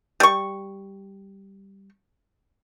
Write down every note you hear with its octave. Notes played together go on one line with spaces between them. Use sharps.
G3 C#6